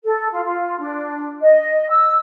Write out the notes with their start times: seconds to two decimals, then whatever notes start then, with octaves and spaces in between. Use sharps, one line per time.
0.04 A4
0.31 F4
0.43 F4
0.79 D4
1.41 D#5
1.89 E6